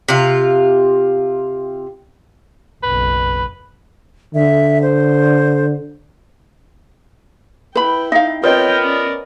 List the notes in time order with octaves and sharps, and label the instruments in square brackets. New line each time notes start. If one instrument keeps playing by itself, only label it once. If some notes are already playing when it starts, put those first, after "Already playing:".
[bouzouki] C3 F4
[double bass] F#1 B1 [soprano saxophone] B4
[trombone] D3 [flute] E5
[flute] C5
[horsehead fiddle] E4 G5 [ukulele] B4 B5
[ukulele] D#4 F5 [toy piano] E5
[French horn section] B3 A#4 [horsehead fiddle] C4 G5 [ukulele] F4 [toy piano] B4 C#5 D#5
[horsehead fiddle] C#4 D5